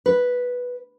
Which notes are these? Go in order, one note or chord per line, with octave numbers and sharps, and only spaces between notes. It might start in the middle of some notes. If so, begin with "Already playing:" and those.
B4